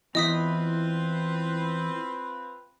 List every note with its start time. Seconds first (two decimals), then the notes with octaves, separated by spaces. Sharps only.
0.15 E2 C4 E4 F4 B4 D#5 D#6 B6